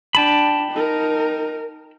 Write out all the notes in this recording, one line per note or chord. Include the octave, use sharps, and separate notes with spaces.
D4 G5 A5 B5
D#4 A#4